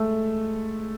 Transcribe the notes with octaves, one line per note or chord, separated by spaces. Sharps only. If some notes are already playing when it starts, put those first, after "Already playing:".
Already playing: G#3 A3 A4